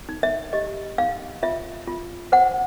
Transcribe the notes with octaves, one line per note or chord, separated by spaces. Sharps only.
D#4
E5
G4 D#5
D#4 F5
F4 E5
F4
C5 F#5